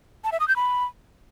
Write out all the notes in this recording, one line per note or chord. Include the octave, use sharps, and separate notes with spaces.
A5
E5
D#6
G6
B5